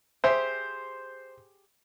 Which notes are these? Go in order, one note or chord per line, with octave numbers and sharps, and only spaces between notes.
G4 G#4 C5 E5